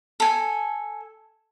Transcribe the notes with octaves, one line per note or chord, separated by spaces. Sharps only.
A4 G#5